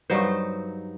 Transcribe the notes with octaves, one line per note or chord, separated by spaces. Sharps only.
G2 F#3 D#4 C5